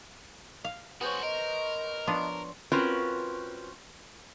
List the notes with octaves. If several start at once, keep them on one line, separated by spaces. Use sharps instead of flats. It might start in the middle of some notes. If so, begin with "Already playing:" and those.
F5
B3 F#4 G#4 C5 C#5
A#4 D#5
F3 B3 D4 C#5 C6
C4 C#4 F4 F#4 A#4 B4